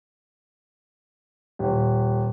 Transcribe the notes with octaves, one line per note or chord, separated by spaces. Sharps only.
D#1